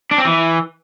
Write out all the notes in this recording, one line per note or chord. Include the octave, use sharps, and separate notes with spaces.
D4
C4
E3